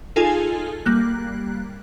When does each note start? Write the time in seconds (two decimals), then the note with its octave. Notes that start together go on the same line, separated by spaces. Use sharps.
0.16 D#4 F4 G#4 A4 G#5
0.86 G3 A#3 F#6